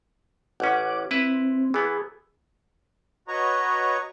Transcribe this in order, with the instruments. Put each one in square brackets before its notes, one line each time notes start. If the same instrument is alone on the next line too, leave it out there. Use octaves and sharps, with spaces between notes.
[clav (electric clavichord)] A1 C#4 [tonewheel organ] F#5 D6
[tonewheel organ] C4 [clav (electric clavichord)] E4 B4
[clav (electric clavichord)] E3 B3 [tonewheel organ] G#4
[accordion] F#4 B4 C#5 D#5 A#5 C#6